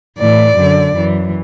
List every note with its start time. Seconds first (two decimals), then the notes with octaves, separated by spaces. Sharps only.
0.18 A2 E3 D5
0.57 F#2 D3
0.96 F#2 E3